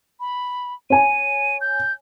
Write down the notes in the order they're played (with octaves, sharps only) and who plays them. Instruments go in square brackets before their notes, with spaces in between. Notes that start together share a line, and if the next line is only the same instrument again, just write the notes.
[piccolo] B5
[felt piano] C#5 G#5 [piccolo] D#7
[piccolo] G6